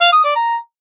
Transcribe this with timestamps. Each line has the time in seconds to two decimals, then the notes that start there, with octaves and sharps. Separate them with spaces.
0.01 F5
0.13 D#6
0.24 D5
0.36 A#5